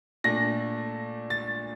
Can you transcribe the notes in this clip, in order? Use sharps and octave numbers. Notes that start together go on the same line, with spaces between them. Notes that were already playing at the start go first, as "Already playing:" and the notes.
A#2 A3 D4 A#6
A6